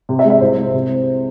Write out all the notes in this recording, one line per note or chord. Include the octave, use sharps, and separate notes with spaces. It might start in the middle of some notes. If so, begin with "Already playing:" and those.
C3
E5
G#3
E5
C2 C5
G#3
C3